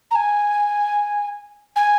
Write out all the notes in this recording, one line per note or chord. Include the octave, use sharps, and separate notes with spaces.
A#5
G#5
G#5